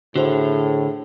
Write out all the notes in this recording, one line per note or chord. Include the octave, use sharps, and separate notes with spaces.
A2 D3 F#4 G#4 C5 F7